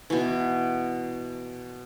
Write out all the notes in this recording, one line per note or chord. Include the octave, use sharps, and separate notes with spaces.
B2 E3